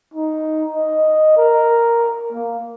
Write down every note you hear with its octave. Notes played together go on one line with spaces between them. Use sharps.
D#4
D#5
A#4
A#3